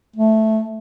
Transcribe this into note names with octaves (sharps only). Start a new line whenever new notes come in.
A3